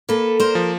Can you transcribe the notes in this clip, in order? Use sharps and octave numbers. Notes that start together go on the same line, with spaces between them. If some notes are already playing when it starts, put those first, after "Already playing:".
A#3 A4 B4
A#4 C5
F3